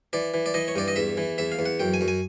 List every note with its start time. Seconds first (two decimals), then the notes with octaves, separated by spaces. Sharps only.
0.13 E3 D5
0.34 E3
0.46 D5
0.54 E3 D#5
0.68 C#5
0.76 G2 D5
0.88 D#5
0.96 E2 E5
1.17 E3
1.38 E2 E5
1.52 F5
1.59 E2
1.66 F#5
1.79 F#2 G5
1.94 G#5
2.01 F#2
2.08 G#5